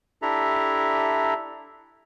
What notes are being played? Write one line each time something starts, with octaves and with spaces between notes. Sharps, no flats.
D4 E4 G4 A4 E5 A#5